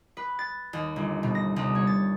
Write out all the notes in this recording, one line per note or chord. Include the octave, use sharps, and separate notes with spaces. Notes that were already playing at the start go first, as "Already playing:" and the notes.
B4
A6
D#2
G1
B2
A#6
C2
C#5
A6